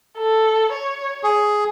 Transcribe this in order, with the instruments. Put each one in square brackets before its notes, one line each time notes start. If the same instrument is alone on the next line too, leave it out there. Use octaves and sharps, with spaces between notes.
[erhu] A4
C#5
[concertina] G#4